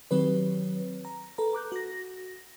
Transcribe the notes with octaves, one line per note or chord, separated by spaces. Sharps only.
D#3 F#3 C4 G4 B4 C#5
A#5
A4 B4 A#5
A#5 D6 F#6 G6
F#4 A#6